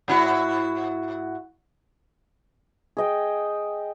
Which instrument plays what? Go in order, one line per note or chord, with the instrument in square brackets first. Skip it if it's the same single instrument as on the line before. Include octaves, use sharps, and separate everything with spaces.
[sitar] G#2 E4 F#4
[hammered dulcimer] G#4 D#5 G5